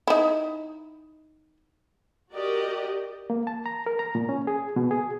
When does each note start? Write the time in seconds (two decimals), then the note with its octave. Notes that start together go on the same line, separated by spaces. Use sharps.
0.07 D#4 E4
2.34 F#4 G4 A#4 D5 D#5
3.30 A#3
3.47 A5
3.66 A#5
3.86 A#4
3.99 A#5
4.15 A#2
4.29 C#4
4.47 G#4
4.76 B2
4.91 G#4